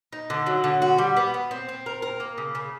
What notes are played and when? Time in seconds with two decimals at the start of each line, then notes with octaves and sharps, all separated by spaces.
0.13 D#4
0.30 D3
0.46 F#3
0.64 D3
0.82 F#4
0.98 G3
1.17 B3
1.34 B3
1.51 C4
1.69 C4
1.86 A#4
2.02 A#4
2.20 A#3
2.38 C#3
2.55 C#3